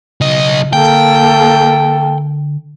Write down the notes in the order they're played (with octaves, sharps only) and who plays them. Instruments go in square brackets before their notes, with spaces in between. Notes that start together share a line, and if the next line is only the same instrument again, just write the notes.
[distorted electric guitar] B1 D#5 [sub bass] C#3
[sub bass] D3 [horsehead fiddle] A#3 A4 [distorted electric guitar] G5